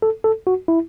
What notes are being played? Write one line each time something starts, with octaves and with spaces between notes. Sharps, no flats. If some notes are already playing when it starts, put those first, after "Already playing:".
A4
A4
F#4
E4